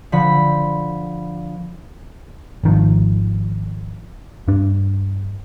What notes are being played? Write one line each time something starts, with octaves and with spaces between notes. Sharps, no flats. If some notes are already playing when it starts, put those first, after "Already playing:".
D3 F3 B5
G#1 D#3 F3
G2 D4